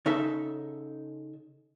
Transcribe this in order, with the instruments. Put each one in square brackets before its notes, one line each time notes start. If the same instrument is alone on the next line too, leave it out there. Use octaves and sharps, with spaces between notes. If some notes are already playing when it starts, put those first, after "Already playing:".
[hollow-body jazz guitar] C#3 D#4 A4 E5